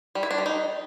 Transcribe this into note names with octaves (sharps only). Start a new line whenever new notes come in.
G3
E4
D4
G3
D#4